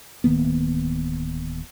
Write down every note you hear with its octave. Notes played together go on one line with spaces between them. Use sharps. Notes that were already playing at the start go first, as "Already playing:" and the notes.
D1 D#3 A#3 B3